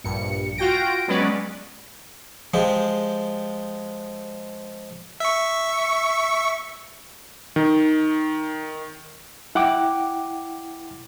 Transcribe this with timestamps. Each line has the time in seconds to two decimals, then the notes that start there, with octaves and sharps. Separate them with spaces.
0.04 A#1 G2 C#7
0.57 F4 F#4 G5 A#6 D7
1.08 F#3 G#3 B3 C#4 B4 D5
2.54 F3 G#3 G4
5.20 E5 C#6
7.56 D#3
9.55 E4 F#5 G5 D6